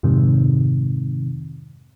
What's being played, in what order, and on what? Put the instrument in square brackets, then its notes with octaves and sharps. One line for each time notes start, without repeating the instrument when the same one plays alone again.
[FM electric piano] F2 G#2 C3 D#3